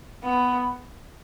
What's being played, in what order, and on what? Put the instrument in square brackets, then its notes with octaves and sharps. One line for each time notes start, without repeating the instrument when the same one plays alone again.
[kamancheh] B3